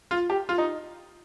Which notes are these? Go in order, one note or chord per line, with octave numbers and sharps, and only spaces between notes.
F4
G4
F4
D#4